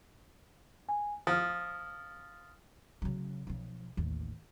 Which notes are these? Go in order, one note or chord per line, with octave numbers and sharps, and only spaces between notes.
G#5
F3 D#6 F6
C#3 F#3
B1 F3
A1 D#2